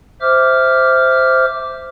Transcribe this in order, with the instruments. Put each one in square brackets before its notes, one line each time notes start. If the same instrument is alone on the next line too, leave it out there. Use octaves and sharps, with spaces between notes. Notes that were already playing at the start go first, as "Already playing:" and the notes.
[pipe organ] C5 E5 D6 F6